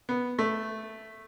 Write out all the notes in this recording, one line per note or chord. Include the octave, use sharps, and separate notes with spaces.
B3
A3